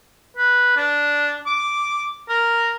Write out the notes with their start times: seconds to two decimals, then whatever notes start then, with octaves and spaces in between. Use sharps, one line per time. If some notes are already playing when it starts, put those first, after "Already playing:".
0.37 B4
0.77 D4
1.47 D6
2.29 A#4